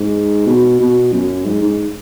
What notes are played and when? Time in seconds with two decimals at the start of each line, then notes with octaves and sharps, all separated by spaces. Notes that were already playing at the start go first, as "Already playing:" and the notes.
Already playing: G#2
0.47 B2
0.79 B2
1.12 F#2
1.45 G#2
1.61 G#2